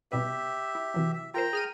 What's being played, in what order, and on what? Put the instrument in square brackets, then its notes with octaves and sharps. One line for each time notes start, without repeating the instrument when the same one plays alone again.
[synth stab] C2 B2 B4 [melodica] G4 E5
[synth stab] E4
C3 E3 F#3
[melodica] E5
[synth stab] F4 A#4 C5 [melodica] G5 A#5
[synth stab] G#4 F6 D#7